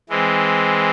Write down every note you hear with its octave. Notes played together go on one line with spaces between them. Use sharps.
E3 G#3 C4